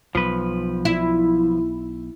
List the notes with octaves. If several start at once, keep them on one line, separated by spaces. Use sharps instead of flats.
B1 F3 B4
E4